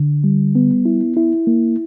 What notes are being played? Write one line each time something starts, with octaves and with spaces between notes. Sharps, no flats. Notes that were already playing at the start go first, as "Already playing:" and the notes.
Already playing: D3
G3
B3
E4
E4
A#3